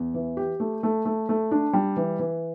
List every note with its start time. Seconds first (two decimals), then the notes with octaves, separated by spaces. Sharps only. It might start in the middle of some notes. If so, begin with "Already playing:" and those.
Already playing: E2
0.14 E3
0.37 G4
0.60 A3
0.83 A3
1.05 A3
1.29 A3
1.51 D4
1.73 G3
1.96 E3
2.19 E3